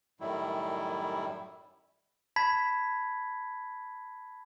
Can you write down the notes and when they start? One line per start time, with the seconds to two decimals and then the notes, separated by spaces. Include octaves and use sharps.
0.21 F#2 A2 D#3 G3 E4
2.36 A5 B5 G#6 B6